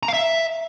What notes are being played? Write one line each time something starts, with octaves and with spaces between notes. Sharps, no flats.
A#5
F5
E5